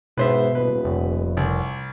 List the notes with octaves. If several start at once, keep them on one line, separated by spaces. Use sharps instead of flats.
G#2 B2 B4 C5 E5
D#1 B4
F1
C2